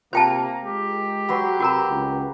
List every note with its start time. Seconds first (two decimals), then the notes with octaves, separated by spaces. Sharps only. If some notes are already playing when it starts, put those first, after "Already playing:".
0.13 C3 A#3 F4 A#4 C5 F5 G5 A5
0.63 G#3 G4
1.29 F#3 B4 C6
1.60 C3 F#4 A#4 A#5
1.90 C#2